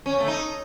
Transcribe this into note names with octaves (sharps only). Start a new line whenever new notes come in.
C#4
C#3
A3
D#4